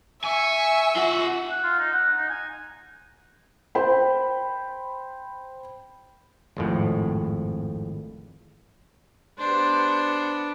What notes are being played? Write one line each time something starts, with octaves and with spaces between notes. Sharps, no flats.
E5 G#5 C#6
F4 F#5
F#5
F4
D#4
F#5
D#4
G#5
C5 G5 B5
G#1 F2 A2
B3 D4 G4 C5